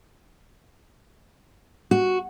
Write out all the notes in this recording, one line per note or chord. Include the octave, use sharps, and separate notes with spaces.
F#4